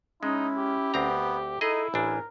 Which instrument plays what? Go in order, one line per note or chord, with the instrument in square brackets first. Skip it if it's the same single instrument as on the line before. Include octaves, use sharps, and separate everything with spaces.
[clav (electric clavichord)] G#3 [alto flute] C#4 [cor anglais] D#4 [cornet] E4
[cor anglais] G4
[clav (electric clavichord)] D2 C4 A#5 [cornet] B3
[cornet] D#4 [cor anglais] E4 [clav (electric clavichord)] G#4 D#5 [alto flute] A4
[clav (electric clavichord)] A1 D4 [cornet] A#4 [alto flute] G#5